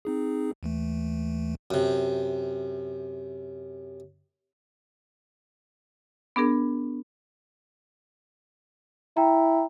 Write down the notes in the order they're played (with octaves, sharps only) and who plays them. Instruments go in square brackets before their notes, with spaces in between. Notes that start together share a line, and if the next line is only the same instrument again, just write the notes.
[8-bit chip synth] C4 D#4 G#4
D#2 E3 A3
[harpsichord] F#2 C3
[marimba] B3 D4 G#4 A#4
[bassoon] E4 [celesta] G5 A#5